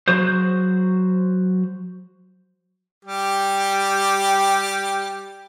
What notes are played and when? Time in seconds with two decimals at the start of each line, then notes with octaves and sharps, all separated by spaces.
0.08 F#3 F#4 G#4 C5
3.05 G3 G4